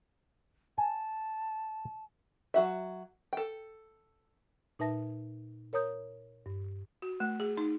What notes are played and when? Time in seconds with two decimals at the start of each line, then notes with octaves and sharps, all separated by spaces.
0.78 G#5 A5
2.54 F#3 F#4 E5
3.33 A4 G5
4.79 A#2 D#4 B4 E5 A5 A#6
5.73 A#4 C#5 A#5 D#6 G6
6.46 G2
7.02 F#4
7.20 A3
7.40 G#4
7.57 D#4